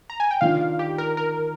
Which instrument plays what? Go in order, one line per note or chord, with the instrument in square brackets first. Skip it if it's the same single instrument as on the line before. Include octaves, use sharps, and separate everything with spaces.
[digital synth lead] A#5
G#5
G5
[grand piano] D#3 A#3 D4 F4 [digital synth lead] F5
[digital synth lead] G4
A#4
A#4